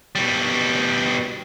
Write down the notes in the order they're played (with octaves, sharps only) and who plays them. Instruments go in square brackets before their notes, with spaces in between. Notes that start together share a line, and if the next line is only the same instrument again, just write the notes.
[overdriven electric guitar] B2 G3